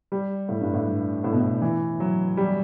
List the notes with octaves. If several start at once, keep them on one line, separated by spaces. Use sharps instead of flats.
G3
A2
G2
A2
G2
A2
B2
A2
E3
F#3
G3